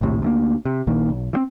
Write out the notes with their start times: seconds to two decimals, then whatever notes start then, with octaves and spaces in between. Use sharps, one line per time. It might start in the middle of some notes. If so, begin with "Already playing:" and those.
0.01 A#1 D#2 A2 C3
0.22 D2 A3 A#3
0.65 C3
0.87 A#1 A#2 D#3 A#3
1.09 B1
1.33 E3 C4